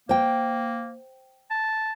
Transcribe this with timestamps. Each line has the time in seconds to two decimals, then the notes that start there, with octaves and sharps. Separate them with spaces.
0.09 A#3 C5 G5
1.50 A5